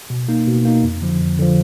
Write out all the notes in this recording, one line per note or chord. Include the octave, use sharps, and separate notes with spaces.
B2
A#3 D#4
B2
A#3 D#4
F2
D3 F3
F2
D3 F3